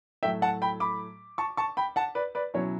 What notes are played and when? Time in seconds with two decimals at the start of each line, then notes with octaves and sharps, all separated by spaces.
0.23 A2 F#3 A3 E5 G5
0.42 F#5 A5
0.62 G5 B5
0.80 B5 D6
1.38 A5 C#6
1.57 A5 C#6
1.77 G5 B5
1.96 F#5 A5
2.15 B4 D5
2.35 B4 D5
2.54 B2 F#3 C#4 E4 C#5